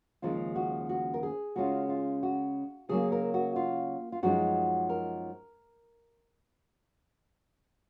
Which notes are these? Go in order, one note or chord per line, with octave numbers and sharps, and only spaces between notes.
D#2 C#3 F3 G#3 F4
F#4
F#4
A#4
G#4
C#3 G#3 C#4 F4 F#4
F4
F#4
C#3 F#3 A#3 G#4
A#4
F#4
F4
F4
F#2 F3 G#3 D#4 F#4
A#4